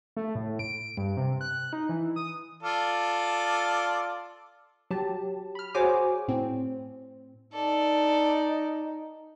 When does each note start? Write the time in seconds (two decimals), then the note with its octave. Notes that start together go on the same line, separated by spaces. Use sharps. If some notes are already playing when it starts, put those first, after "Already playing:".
0.17 A3
0.35 A2
0.59 D7
0.97 G2
1.17 C3
1.41 F#6
1.73 D#4
1.89 E3
2.16 D#6
2.63 F4 A4 D5
4.91 F#3 G4 A5
5.55 B5 F6
5.74 F#4 G#4 C5 C#5 G#5 D6
6.28 A2 C4
7.53 D#4 A4 D5